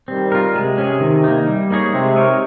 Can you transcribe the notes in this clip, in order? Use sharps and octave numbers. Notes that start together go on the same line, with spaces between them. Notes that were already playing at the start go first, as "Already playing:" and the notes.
D#3 G3 C4
F4 A#4
C3 G#3
C#4 G#4
D#3
A#3 D#4
G3
A#3 D#4 G#4 C#5
C3 G#3
D#4 A#4 C#5